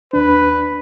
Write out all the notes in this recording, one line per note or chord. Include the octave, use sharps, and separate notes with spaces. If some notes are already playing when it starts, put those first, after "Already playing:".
D#2 D4 B4